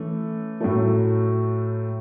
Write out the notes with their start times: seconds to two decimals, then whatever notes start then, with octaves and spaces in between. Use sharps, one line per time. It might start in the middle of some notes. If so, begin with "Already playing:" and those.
Already playing: E3 A3 C#4
0.61 A2 F#3 A3